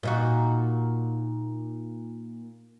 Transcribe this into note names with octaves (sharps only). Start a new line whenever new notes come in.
A#2 D#4 F#4